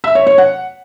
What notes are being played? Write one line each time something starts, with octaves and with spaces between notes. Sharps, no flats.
E5
C#5
C#5
F#5